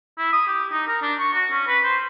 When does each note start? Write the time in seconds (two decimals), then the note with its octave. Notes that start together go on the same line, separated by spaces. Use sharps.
0.18 E4
0.33 D#6
0.47 G4
0.72 D#4
0.87 A#4
1.02 D4
1.19 C#6
1.33 F#4
1.52 C#4
1.67 B4
1.84 C5